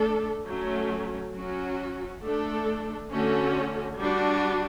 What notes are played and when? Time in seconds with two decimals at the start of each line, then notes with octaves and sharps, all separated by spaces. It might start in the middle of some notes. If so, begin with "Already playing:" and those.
Already playing: A3 D4 A4
0.45 F#3 A3 C#4
1.34 F#3 C#4 F#4
2.23 A3 D4 A4
3.11 D3 A3 C#4 F#4
4.00 G3 D4 F#4